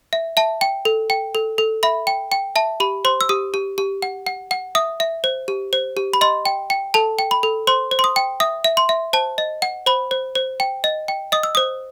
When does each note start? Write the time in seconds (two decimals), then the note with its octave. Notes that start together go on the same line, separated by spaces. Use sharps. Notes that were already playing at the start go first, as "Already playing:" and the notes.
0.13 E5
0.37 E5 A5
0.61 G5
0.85 A4
1.10 G5
1.35 A4
1.58 A4
1.83 E5 B5
2.07 G5
2.32 G5
2.56 E5 A5
2.80 G4 B5
3.05 C5 C6
3.21 E6
3.29 G4 D#6
3.54 G4
3.78 G4
4.02 F#5
4.27 F#5
4.51 F#5
4.75 E5 D#6
5.00 E5
5.24 C5
5.48 G4
5.73 C5
5.97 G4
6.13 B5
6.21 D#5 C6
6.46 G5
6.70 G5
6.94 A4 A5
7.19 G5
7.31 B5
7.43 A4
7.67 C5 C6
7.91 C5
7.99 C6
8.04 D#6
8.16 G5
8.40 E5 D#6
8.64 E5
8.77 C6
8.89 E5
9.13 C5 A5
9.38 D#5
9.62 F#5
9.86 C5 B5
10.11 C5
10.35 C5
10.60 G5
10.84 D#5
11.08 G5
11.32 D#5 D#6
11.43 E6
11.55 C5 D#6